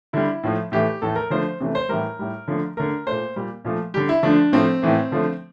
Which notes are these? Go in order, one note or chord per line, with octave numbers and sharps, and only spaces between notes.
D3 G3 E4
A2 F3 A3
A2 E3 A3 G4
A2 E3 A3 A4
A#4
D3 F3 A3 C5
C3 E3 A3
C5
A2 E3 G3 A#4
A2 G3
D3 F3 A3
D3 A3 A#4
A#2 A3 C5
A#2 G3
A#2 F3 A3
D3 G3 G4
E4
D3 F3 A3 D4
A2 F3 A3 C4
A2 E3 A3
D3 F3 A3